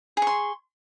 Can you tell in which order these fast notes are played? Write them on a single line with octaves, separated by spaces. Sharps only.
G#4 C#6 C6